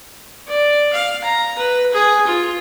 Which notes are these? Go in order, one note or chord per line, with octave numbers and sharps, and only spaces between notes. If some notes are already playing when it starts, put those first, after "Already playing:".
D5
F5
A#5
B4
G#4
F4